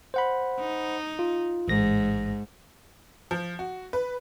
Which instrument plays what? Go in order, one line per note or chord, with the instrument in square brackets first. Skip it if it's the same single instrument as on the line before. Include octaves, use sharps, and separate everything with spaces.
[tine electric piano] C5 F#5 B5
[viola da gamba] D#4
[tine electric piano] F4
[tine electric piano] A1 A#6 [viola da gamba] G#2
[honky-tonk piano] F3
F#4
B4